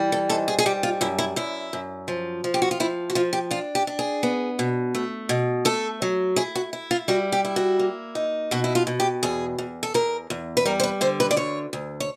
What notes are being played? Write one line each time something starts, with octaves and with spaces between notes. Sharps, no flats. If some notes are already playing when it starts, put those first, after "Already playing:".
Already playing: E3 G3
A4
G#2 A4
G#4
G#4
G3 G4
F4
F#2 E4
E4
F#2 E4
F#2
F3
F3
G4
F#4
F4
F3 E4
F#4
F3 F4
G4
D4 F4
G4
D4
G#4
B3
B2
A3
B2
A3 A4
F#3
E4 G#4
F#4
E4
F4
G3 F#4
G4
E4
F#4
A#3
D#4
B2 F#4
E4
F4
B2
G4
E2 G#4
E2
A4
E2 A#4
E2
B4
G3 A#4
C5
B4
D3 C5
B4
D5
D2 C#5
D2
C#5